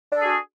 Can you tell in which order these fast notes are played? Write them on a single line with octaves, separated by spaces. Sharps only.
D4 A4 G#4 F#4